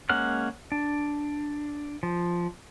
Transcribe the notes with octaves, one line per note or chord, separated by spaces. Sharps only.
G#3 A#3 C#4 F#5 F6
D4
F3